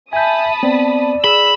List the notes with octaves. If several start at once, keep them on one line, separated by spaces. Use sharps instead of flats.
E5 G#5 A5 B5 D#6 G6
B3 C4 D5
G#4 B5 E6